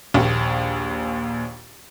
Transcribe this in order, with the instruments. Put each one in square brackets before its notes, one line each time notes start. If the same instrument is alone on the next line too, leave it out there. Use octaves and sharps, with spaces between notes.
[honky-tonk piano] A#1 D#2